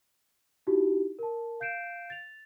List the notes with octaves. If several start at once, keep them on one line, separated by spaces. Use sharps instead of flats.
D#4 E4 F#4 G4
A#4 A5
F5 G6 C7 D7 E7
A6 F7